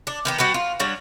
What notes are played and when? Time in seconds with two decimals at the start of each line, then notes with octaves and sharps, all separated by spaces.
0.07 D4
0.25 D#3 B3 G4
0.38 G3 F#4 G4 B4
0.54 F4
0.79 G3 D4 F#4 C#5